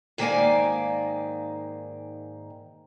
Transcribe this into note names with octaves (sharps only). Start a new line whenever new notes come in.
G#2 D#3 A#3 D5 F5 G#5